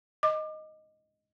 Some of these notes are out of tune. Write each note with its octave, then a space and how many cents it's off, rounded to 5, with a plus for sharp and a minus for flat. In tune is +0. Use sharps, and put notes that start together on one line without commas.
D#5 +0 D6 +25